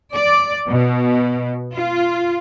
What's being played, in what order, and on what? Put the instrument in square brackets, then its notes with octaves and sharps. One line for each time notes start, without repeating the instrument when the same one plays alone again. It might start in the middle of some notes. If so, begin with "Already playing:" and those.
[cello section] D5
B2
F4